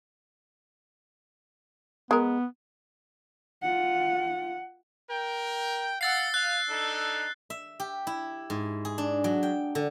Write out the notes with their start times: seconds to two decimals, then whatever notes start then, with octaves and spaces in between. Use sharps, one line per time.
2.11 G#3 B3 A#4
3.62 F4 F#5
5.10 A#4 G5
6.01 F5 F#5 E6 A6 C7
6.34 F5 F#6
6.68 D4 D#4 A4
7.50 E5
7.80 G4
8.07 E4
8.50 G#2
8.85 G#4
8.98 D4
9.24 F#3
9.43 G5
9.75 D3